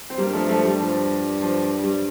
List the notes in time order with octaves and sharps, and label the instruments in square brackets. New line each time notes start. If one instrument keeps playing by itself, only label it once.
[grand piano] C4
[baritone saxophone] G2 [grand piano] G3 A#3
[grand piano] F3 A3
F3 A3
G3
F3
F3
G3